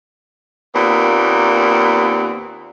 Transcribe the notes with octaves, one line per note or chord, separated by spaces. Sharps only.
D#2 A#2 B3 C4